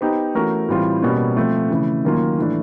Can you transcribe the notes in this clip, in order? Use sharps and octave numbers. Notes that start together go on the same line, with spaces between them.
B3 D#4 G4 C5
E3 A3 C#4 F#4 A#4
A2 E3 G3 C4 F4
B2 G3 A#3 C#4
F3 A3 C4
C#3 E3 A3
D#3 F#3 A#3 C#4 F4
A2 E3 A3 D4